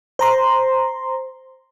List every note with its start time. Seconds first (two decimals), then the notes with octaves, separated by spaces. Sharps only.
0.19 C5 A#5 C6